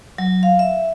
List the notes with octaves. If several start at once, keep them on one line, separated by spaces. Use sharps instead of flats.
F#3
F5
E5